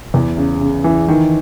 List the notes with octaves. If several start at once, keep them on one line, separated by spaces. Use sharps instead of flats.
E2
C#3
C#3
E3
D#3